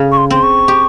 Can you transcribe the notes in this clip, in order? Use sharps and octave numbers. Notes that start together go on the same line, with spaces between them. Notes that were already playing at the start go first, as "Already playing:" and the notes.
Already playing: C#3
C#6
C6
C4 C6
C#6
G4